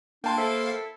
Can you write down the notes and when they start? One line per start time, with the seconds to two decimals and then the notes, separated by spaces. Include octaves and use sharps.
0.24 A#3 D4 F5 G5 A5 C6
0.37 E4 A4 C5